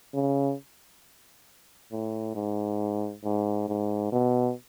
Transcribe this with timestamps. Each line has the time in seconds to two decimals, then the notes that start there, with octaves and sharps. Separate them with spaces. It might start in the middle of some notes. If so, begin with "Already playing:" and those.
0.14 C#3
1.92 A2
2.35 G#2
3.24 G#2
3.69 G#2
4.12 B2